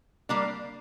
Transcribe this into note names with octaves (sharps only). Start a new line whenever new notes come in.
G3 A#3 D4